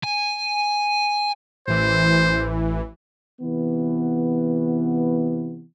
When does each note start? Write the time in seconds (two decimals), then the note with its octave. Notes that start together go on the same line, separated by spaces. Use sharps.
0.04 G#5
1.68 A1 E3 C5
3.42 C3 E3 B3